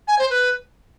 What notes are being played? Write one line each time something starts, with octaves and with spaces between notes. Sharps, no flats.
G#5
C5
B4